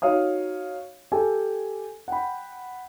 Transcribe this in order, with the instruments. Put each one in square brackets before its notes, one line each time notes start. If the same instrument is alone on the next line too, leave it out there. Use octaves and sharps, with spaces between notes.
[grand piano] D#4 F#4 C#5 F5 D#6
G4 A4 G5 G#5
F#5 G5 B5